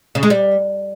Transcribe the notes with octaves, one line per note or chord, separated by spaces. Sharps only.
C#3
G#3
G3